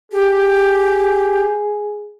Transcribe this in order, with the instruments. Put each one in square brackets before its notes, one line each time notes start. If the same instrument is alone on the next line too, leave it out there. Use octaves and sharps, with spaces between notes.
[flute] G4 [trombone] G#4